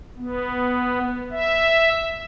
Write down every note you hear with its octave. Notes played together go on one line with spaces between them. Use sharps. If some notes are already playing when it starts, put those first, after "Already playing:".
B3
E5